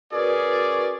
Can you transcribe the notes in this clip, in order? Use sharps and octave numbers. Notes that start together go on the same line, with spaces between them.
C#4 F#4 G#4 A#4 B4 D5